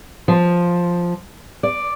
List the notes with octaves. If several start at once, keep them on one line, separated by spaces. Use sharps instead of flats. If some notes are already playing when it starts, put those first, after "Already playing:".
F3
D5